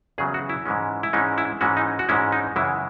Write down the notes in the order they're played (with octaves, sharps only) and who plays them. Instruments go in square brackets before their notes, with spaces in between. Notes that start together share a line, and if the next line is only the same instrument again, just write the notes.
[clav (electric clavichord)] E2 C#3 F#3 G#4
F#4
E4
G#2 E3 G#3 C#4
E4
G#2 E3 G#3 C#4 D#4
E4
G#2 E3 G#3 C#4 F#4
D#4
F#4
G#2 E3 G#3 C#4 E4
D#4
F#2 C#3 E3 G#3 E4